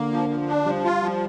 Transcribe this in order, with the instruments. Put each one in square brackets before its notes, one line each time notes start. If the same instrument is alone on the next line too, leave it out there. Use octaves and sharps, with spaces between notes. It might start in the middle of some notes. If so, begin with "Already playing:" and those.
Already playing: [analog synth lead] D3 [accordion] A#3
[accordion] F3
F3
D4
[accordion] F3 [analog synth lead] G3
[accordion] F4
F3